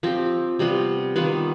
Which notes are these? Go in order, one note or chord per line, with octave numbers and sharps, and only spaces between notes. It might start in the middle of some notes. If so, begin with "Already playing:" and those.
F3 C4 G4
C3 G3 B3 F4
D#3 G3 B3 F4